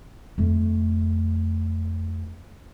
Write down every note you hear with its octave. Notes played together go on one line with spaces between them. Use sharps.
F2 A3